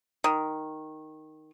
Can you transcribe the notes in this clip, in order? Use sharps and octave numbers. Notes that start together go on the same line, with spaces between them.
D#3